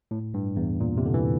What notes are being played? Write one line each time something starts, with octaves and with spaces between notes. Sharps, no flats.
A2
G2
E2
A#2
C3
D3
E3